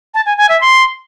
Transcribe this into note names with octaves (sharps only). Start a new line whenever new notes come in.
A5
G#5
G#5
E5
C6